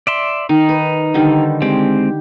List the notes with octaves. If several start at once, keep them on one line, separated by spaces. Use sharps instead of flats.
D5 E5 C6
D#3 D#4
B4
D3 D#3 G3
G#3 C4 G4